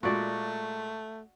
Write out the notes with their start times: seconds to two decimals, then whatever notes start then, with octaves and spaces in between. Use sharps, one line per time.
0.03 A#2 G#3 A3 F#4 D5